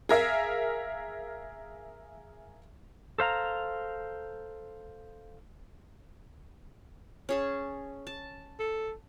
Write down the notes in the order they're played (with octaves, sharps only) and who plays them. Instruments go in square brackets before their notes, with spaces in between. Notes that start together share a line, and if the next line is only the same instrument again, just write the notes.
[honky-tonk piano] G#4 A#4 E5 F5
[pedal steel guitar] A4 C5 F5 A#5
[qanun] C#4 G#4 A5
A5
[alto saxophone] A4